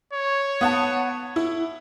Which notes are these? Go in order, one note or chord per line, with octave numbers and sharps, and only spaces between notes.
C#5
B3 F#5 A5
E4